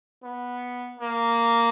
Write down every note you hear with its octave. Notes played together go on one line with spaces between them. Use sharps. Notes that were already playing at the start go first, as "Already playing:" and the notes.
B3
A#3